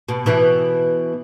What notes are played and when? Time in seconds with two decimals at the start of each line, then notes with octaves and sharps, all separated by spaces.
0.09 B2
0.26 B2 E3